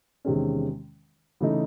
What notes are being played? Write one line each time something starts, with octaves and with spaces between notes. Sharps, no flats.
E2 C3 D#3 G#3 C#4
C#3 E3 A3 D#4